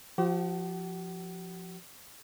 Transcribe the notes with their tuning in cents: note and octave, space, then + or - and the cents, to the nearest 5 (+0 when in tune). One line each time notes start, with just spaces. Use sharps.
F3 +5 G4 -40 F#5 +40